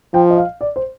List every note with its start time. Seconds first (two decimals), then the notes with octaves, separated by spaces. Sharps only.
0.14 F3 G5
0.30 D#5
0.38 F5
0.61 D5
0.76 C5